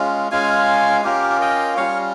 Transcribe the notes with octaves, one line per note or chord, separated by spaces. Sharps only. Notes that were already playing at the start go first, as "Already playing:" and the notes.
Already playing: G#3 C#4 F4
G#3 C#4 F4 F5 G#5
A#3 C#4 F4 G4 A#4
D#5 G5
G3 C#4 F4 C#5 F5